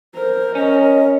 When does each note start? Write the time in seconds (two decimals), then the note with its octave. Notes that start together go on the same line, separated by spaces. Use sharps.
0.15 A#4 C5
0.55 C#4 D#5